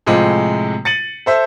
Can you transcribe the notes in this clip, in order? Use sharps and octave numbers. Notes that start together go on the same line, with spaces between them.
A2 C3 F3 G#3
A6 C#7 D#7 F#7
A4 C5 E5